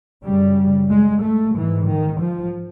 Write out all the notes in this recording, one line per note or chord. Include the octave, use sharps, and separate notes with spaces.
F#2 C#3 G3
G#3
A3
G#2 E3
D#3
F3